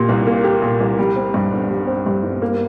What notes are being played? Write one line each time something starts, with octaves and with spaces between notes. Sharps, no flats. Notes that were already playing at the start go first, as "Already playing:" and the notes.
Already playing: A#2 A#3 G4
C2
A#3
G4
A#2
C2
G3
C4
G2
G1
G3
C4
G2
G1
A#3